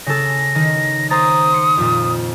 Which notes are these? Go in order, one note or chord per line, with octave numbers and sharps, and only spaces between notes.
C#3 A4 A#6
D#3
C5 A#5 D#6 A6
C6 C#7
F2 A#2